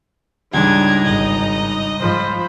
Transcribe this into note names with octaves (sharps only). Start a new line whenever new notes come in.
C#2 G2 D4 D#4 A#5 G#6
G#1 D#5
G#2 F3 C5 B5